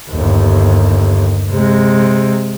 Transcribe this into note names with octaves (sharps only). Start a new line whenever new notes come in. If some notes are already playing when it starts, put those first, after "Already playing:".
G1 D#2
C3 G#3